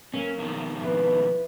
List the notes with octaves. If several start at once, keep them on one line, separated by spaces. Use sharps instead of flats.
F#3 A#3 C#4
F2 B2 D#3
F3 E4 B4